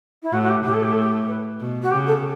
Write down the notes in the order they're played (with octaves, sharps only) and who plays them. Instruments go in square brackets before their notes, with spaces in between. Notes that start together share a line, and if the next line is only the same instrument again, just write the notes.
[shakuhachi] E4
[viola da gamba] A2 [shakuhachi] F#4
[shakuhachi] F#4
G4
[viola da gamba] A2 [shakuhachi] G4
[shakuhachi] A4
G4
A4
G4
B4
[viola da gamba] B2
[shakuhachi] F#4
[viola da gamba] C#3 [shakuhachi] G4
[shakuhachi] A4